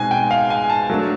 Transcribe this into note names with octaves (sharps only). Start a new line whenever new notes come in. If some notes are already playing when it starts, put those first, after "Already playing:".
Already playing: B2 G#3 C4 D#4 G#5
G5
F5
G#5
A5
F#3 A3 D4